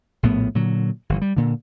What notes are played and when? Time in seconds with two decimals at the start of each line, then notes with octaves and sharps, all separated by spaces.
0.23 A#1 A2 B3
0.55 A#2 D3 F#3
1.10 G1 E3
1.21 G3
1.36 A#2 D3